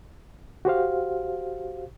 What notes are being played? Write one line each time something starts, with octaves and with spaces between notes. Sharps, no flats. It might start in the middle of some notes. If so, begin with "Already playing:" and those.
F#4 G4 C5 F5